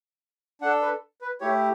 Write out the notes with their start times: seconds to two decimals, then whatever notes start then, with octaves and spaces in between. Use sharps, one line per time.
0.61 D4 F#5
0.65 A4
0.82 B4
1.21 B4
1.41 A3 E4 G4 C#5